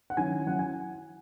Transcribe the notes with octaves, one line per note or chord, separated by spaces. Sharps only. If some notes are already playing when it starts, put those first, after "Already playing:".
F#5
D#3 F#3 C#4 E4 G#5
F#3 C#4 E4 F#5
G#5